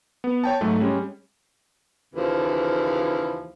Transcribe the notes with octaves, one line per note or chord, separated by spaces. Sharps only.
B3
C#5 G5 A5
G#2 F#3 A3
G3 G#3 C#4
D#2 C#3 E3 F3